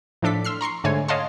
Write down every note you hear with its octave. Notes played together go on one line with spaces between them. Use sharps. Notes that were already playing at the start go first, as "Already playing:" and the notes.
A2 F3 D4 A4 D6 B6
C6 E6 F6 C7
A#5 C6 C#6 C7
G#2 D3 A3 C#5 G#5 G#6
C#5 D#5 F5 F#5 A5 C6